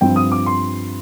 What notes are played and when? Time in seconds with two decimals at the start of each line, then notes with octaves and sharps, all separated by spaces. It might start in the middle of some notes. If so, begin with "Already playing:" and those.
0.01 G2 F3 C4 G5
0.16 D#6
0.32 D6
0.46 C6